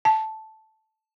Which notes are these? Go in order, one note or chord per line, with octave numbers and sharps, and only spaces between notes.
A5